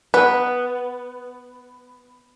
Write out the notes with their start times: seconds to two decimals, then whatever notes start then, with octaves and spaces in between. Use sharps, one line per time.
0.14 B3 B4